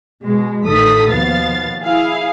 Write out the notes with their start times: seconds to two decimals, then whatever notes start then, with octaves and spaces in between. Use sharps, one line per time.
0.24 B2 G#3
0.66 A1 A2 D#3 A4 D#6 B6
1.11 D#2 B2 F3 B3 F5 A6
1.83 E4 G#4 F5